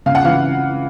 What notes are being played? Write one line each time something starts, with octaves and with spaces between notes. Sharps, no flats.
C#3 F5
F#5
E3 F5